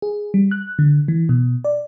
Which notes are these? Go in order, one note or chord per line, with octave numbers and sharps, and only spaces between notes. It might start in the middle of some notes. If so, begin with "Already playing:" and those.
G#4
G3
F#6
D3
E3
B2
D5